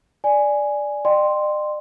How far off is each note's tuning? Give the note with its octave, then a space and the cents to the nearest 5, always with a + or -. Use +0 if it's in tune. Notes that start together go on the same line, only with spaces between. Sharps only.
D5 +0 G#5 +0
D5 +45 G5 +0 C6 +0